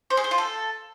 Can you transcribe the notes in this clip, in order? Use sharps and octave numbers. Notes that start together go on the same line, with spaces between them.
C5
G#4
C5
F4
A4